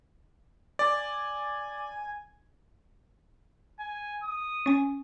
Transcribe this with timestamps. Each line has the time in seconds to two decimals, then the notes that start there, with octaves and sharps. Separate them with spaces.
0.79 D5 G#5
3.79 G#5
4.23 D#6
4.66 C#4 G#5